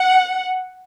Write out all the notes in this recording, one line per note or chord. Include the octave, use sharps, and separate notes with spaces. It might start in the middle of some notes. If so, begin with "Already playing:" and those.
Already playing: F#5